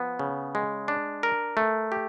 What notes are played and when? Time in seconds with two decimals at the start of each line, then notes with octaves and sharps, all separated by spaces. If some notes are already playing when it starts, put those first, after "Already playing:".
Already playing: F3 B3
0.19 C#3
0.55 G#3
0.88 D4
1.23 A#4
1.57 A3
1.92 G4